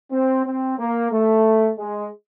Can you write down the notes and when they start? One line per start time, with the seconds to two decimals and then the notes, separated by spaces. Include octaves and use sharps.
0.12 C4
0.45 C4
0.78 A#3
1.11 A3
1.78 G#3